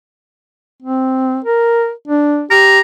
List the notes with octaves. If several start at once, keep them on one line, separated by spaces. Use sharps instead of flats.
C4
A#4
D4
G4 A#5